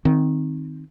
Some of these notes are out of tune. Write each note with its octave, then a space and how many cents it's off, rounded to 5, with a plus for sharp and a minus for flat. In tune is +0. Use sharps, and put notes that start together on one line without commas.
D#3 +0 C4 +0